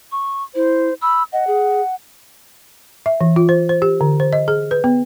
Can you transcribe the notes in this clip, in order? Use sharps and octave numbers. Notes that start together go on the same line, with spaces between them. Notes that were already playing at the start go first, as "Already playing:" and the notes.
C#6
E4 C5
B5 E6
D#5 F#5
G#4
E5
E3
F4
C5
C5
G4
D3
C5
D#5
G#4
B4
B3